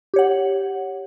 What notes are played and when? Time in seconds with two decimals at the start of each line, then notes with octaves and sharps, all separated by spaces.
0.14 G4
0.16 C#5
0.19 F#5